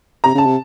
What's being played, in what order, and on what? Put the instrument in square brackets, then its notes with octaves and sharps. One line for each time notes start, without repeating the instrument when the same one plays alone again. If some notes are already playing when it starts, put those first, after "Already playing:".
[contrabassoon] C3 [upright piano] A#5
[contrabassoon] C#3 [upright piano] A5
[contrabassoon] C3